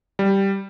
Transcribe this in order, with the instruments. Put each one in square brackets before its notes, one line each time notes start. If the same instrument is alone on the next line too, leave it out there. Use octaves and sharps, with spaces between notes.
[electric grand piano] G3